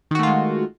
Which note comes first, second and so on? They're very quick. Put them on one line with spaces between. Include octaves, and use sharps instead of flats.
D#3 F#4 A3 F4 G#3